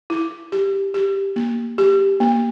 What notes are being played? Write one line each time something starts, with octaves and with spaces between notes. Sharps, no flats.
E4
G4
G4
A#3
G4
A#3